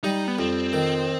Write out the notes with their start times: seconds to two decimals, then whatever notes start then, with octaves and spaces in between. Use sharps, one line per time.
0.03 G3 D#4
0.28 B3
0.39 F2 C4
0.73 D#3